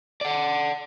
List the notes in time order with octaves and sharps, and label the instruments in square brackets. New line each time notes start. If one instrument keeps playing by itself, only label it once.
[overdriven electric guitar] D5 F#5